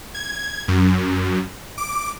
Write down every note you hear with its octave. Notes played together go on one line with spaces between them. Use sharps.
G#6
F#2
D6